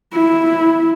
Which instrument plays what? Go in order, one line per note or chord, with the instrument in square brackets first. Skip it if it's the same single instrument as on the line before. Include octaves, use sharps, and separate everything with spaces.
[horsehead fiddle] E4